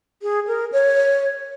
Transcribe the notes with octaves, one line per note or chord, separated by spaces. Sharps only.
G#4
A#4
C#5